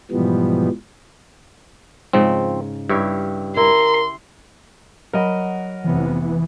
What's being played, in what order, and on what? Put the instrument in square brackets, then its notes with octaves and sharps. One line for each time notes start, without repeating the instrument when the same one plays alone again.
[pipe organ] G#2 B2 E3 F3 G3 B3
[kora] G#2 C#3 [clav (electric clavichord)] F3 C4
[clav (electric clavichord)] G2 [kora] E4 G4 C#5
[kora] E4 [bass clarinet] A#4 [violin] C6
[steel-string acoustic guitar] F#3 F#5 [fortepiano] A#4 D#5 B5
[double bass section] F1 C3 B3 [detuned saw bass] E3